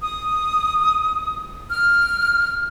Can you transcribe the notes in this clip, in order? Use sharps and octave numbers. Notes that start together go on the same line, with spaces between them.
D#6
F6